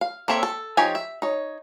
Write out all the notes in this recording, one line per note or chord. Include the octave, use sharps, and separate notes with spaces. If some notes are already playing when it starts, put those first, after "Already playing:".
F5
A#3 C4 A4 C#5 E5
A4
F3 D#4 G4 C#5 G#5
E5
D#4 C#5